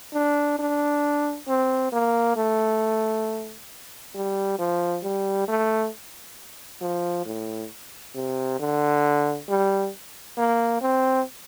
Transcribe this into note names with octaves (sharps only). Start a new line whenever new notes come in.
D4
D4
C4
A#3
A3
G3
F3
G3
A3
F3
A2
C3
D3
G3
A#3
C4